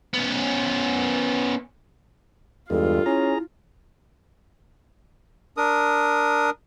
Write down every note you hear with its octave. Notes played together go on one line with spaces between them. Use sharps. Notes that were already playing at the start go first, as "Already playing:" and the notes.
B3 C#4
E2 G2 G#3 F4 A4
C#4 E4 G#4 A#5
D4 A#4 D#6